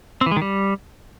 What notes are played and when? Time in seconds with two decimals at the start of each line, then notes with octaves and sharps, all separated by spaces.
0.21 C4
0.26 E3
0.31 G#3
0.37 D#3
0.42 G3